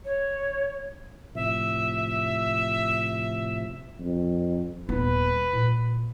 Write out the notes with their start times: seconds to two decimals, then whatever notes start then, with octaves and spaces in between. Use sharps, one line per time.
0.05 C#5
1.35 A2 C3 F3 E5
4.00 F2
4.89 D#1 B3 B4
5.53 A#2